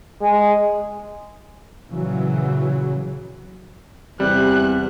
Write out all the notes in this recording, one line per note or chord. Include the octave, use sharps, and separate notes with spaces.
G#3
A#2 C#3 E3 F#3
E2 C3 G3 F#6